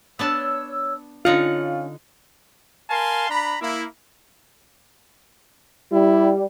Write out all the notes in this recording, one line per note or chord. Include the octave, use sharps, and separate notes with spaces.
B3 D4 C#5 A5 E6
D3 C#4 D#4 F4 F5 F#5
A#4 F5 G#5 A5 C6
D4 A#5 B5
A#3 E4
G3 E4